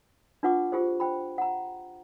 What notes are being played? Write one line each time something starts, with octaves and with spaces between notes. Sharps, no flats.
D4 F4 B4 F#5 C#6 D6
F4 G4 G#4 C5
C5 G5 B5
F#5 A#5